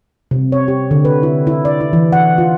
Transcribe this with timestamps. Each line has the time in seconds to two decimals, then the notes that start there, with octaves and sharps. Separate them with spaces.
0.31 C3
0.52 C#5
0.68 G4
0.91 D3
1.05 B4
1.23 E4
1.47 E4
1.65 D5
1.81 E4
1.93 E3
2.13 F#5
2.38 F4